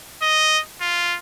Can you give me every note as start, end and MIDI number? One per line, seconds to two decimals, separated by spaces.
0.22 0.60 75
0.81 1.17 65